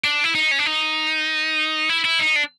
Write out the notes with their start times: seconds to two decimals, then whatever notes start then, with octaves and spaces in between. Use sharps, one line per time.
0.04 D4
0.24 E4
0.35 D#4
0.51 C#4
0.59 D4
0.66 D#4
1.89 E4
2.05 E4
2.19 D#4
2.36 D4